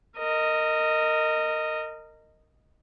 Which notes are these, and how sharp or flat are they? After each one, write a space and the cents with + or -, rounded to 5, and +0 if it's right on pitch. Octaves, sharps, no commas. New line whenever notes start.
A#4 -25 D#5 +0